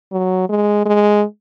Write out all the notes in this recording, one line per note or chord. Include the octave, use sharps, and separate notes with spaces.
F#3
G#3
G#3